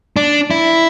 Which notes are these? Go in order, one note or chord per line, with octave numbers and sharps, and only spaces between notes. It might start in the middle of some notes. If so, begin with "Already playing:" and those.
D4
E4